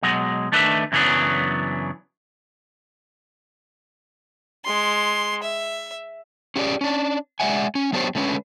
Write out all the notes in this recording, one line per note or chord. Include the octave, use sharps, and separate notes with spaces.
B2 F#3 G#3
D#3 A3 D4 B4 E5
F#2 C#3 E3 F#3 B3 D4
G#3 C6
E5
C#4 G4 G#4 D5
C#4 D4
G#3 D5 E5 F#5 G#5
C#4
F#3 B3 D4 G4 C5 C#5
D3 G#3 A3 C#4 A#4 B4